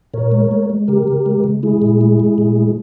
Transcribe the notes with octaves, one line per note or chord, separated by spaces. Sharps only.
A#2 A#4 C#5
G#3
G#3
G#3
C#3 G4 A#4
C#3
G#3
C#3
G#3 E4 G#4
A#2
G#3
G#3
A#2
G#3